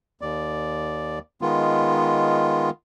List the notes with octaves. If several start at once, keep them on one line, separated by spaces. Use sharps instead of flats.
D#2 D5
D#3 G#3 B3 F4